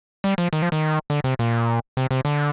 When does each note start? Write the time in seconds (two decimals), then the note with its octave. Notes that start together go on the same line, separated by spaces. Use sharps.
0.24 G3
0.38 F3
0.53 D#3
0.62 F3
0.72 D#3
1.10 D3
1.24 C3
1.39 A#2
1.97 C3
2.11 C3
2.25 D3